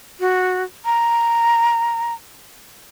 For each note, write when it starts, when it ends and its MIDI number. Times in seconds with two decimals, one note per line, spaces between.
0.20 0.63 66
0.85 2.14 82